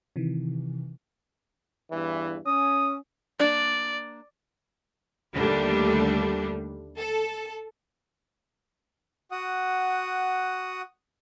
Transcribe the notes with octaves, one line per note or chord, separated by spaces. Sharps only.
C3 D#3 E3
E2 G2 E3
C#4 D#6
A#3 D4 D5
D#2 D3 G3 A3 D4
A4
F#4 F#5 D#6